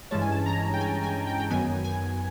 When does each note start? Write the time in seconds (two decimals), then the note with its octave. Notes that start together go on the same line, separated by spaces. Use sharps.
0.11 G2 E3 G#3 C#4 A5
0.22 G#5
0.32 A5
0.46 A#5
0.74 G5
0.81 G#5
1.04 G#5
1.27 G5
1.40 G5
1.50 F#2 D#3 F#3 B3 G#5
1.84 G#5